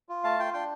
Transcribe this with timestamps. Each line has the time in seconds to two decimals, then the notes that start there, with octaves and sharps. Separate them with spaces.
0.09 F4
0.24 A3 F5 A5
0.39 F4 G5 C6
0.53 D4 G5 C6